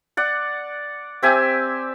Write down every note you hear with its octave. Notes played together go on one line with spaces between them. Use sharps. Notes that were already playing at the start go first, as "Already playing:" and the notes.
D5 F#5
C4 G4 E5 G#5